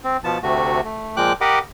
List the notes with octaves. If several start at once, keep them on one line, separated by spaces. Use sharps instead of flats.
C4
B2 F3 B3 A5
D2 C3 A3 F#4
A3
A#2 F3 G#3 G5 D6 F#6
G4 A#4 D#5 F#5 B5 D6